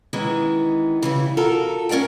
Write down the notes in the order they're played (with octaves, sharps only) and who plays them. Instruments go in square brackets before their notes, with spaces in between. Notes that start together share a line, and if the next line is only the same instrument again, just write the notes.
[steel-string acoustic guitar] D#3 E3 G#3 B3 C#4
C#3 E3 G3
F4 F#4 A4 A#4
C#4 A#4 D5 F5 G5